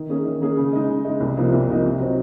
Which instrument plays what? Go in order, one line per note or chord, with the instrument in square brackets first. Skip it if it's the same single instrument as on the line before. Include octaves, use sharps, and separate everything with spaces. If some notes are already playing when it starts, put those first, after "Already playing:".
Already playing: [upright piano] D#3
A#3 C#4 G#4
D#3
A#3 C#4 G#4
C#3
G#3 D#4
C#3
G#3 D#4
C2
C3 F3 A#3 D#4
C2
C3 F3 A#3 D#4
C3
F#3 C4 D#4 F#4